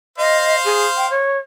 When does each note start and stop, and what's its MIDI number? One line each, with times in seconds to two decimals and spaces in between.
0.18 1.22 72
0.18 0.56 75
0.18 1.22 77
0.64 0.86 68
0.96 1.09 79
1.10 1.37 73